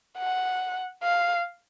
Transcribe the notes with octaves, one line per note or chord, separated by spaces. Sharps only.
F#5
F5